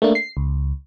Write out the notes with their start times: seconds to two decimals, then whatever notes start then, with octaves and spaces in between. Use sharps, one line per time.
0.02 A3 A#3 D4
0.15 C7
0.37 C#2